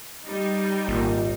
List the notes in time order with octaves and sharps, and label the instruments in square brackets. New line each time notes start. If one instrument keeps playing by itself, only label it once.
[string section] G3 D#4
[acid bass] G#1 [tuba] A#2